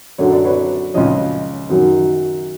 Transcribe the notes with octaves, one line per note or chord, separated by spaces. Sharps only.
F#2 D3 F#3 C#5
D5
B4 C#5
C#2 C#3 F3 C#5 D#5
F#2 D#3 F#3